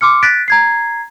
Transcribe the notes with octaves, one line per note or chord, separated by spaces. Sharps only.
C6 D6 F6 C#7
F#6 A6 B6 D7
A#5 G#6 C7